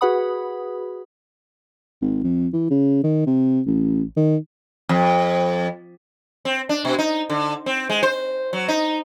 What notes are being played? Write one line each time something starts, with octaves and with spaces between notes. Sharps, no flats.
F#4 G#4 B4 F#5 B5 D#6
G#1
F2
E3
C#3
D#3
C3
A1
D#3
F2
C4
D4
B2
D#4
D3
C4
G#3
C5
F#3
D#4